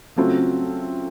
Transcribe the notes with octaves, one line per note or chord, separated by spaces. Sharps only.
C#3 F#3 A3 C4 F4